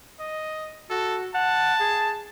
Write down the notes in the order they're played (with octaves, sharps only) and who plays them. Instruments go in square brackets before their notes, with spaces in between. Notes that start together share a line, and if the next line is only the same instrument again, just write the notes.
[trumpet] D#5
[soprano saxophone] F#4 [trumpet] A4
[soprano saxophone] F#5 [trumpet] A5
[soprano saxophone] G#4